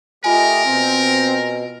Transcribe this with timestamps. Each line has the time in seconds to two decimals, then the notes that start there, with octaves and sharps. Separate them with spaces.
0.24 A3 F4 G4 A#4 D#5 G#5
0.66 B2 C4